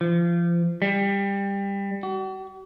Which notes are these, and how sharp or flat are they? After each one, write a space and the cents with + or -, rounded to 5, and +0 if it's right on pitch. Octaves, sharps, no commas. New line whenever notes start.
F3 -30
G3 +20
F#4 +45